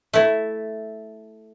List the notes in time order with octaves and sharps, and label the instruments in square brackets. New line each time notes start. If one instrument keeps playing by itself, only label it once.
[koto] A3 E4